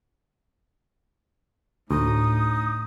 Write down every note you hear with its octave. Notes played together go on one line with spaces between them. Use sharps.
D2 A2 D#4 D#6